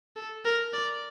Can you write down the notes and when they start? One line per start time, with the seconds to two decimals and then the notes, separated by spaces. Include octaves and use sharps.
0.16 A4
0.45 A#4
0.73 D5